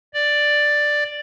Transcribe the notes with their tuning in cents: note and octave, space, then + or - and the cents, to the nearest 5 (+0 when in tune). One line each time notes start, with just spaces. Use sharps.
D5 +5